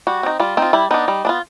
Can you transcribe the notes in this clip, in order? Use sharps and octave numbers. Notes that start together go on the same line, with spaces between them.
G3 F#4
C4 D#4
G3 F4
C4 D#4 F4
G3 E4
B3 D4 D#4
G3
B3 D4 F4